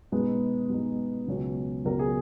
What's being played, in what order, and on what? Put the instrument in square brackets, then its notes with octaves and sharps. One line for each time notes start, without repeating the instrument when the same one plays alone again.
[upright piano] B2 G#3 B3 D#4
B2 G#3 B3 D#4
C#2 B2 F#3 C#4
C#2 B2 F#3 C#4 A#4
G#4